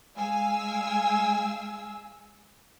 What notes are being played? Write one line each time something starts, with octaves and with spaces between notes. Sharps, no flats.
G#3 F5 G#5 E6